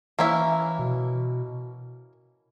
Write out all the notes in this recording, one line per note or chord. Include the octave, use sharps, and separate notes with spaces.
E3 A#3 C#4 E4
B2